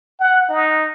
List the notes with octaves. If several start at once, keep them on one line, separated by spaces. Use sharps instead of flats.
F#5
D#4